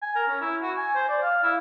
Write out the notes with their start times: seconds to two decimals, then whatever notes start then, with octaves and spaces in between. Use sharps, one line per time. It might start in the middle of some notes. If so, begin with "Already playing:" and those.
0.02 G#5
0.16 A#4
0.28 C#4
0.41 E4
0.62 F#4
0.77 G#5
0.95 C5
1.09 D5
1.22 F5
1.43 E4